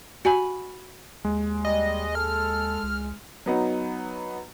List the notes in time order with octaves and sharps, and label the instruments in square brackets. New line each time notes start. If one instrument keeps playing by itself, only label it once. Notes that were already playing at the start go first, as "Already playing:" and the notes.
[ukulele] F#4 G#5 B5
[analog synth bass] D#2 [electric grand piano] G#3
[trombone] G3 [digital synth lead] D#5
[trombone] A4 [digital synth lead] F6
[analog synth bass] C#2
[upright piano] F#3 B3 D#4